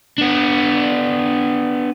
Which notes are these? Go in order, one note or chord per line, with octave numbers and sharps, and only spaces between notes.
B3 D4